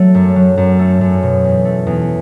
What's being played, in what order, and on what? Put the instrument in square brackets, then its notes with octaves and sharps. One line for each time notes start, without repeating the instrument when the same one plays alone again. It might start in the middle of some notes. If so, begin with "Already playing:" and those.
Already playing: [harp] F#3 A3
F#2
F#3
F#2
A3
F#2
B2
E2
A3
E2